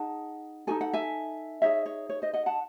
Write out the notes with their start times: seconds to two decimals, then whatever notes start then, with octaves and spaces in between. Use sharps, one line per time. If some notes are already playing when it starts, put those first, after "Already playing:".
Already playing: D#4 G#4 F#5 A5
0.67 D#4 F#4 A4 G#5
0.81 F#5
0.93 E5 G#5
1.62 D#4 G#4 C#5 E5
1.86 C#5
2.09 C#5
2.22 C5 D#5
2.34 D#5 F#5
2.46 F#5 A5